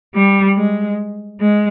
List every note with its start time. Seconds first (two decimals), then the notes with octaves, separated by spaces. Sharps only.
0.14 G3
0.56 G#3
1.40 G#3